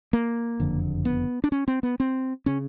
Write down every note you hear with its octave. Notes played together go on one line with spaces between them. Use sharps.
A#3
F#1 F2 D3
B3
D4
C#4
C4
B3
C4
C#3 C#4